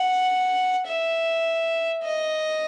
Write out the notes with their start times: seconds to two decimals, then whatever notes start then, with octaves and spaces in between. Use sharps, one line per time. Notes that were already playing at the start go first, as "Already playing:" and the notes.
Already playing: F#5
0.87 E5
2.03 D#5